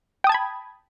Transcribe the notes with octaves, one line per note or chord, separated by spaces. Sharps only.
G5 A5 B5 D#6 G#6